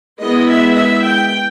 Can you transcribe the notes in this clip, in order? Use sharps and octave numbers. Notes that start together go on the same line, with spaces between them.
G#3 B3 E4 D#5
E5
E5
G5